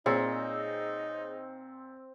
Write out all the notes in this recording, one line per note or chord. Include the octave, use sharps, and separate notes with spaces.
A#2 C4 D#4 G#4 C#5